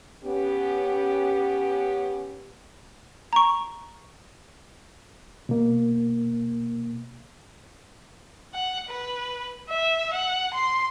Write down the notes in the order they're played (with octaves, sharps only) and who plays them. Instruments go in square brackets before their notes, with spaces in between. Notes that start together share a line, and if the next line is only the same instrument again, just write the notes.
[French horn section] B3 C#4 G4
[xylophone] A#5 C#6
[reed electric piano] B2 A#3
[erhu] F#5
B4
E5
F#5
C6